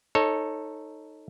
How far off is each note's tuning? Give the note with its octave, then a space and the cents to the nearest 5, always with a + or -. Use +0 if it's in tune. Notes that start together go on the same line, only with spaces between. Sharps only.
D#4 +0 A4 +5 C#5 -20